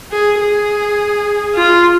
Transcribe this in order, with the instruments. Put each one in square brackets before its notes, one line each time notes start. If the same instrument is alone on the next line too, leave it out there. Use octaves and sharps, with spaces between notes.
[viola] G#4
G#4
F4